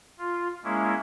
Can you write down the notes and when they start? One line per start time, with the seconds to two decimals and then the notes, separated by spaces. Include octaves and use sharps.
0.19 F4
0.64 G#3 A#3 C#4 E4